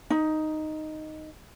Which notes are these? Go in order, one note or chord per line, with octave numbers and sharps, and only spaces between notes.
D#4